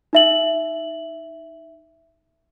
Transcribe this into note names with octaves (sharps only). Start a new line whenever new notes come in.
D#4 E5 F#7